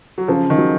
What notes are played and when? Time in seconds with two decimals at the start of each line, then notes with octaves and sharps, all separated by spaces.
0.18 F#3
0.28 C#3 F3
0.50 D#3
0.58 F#3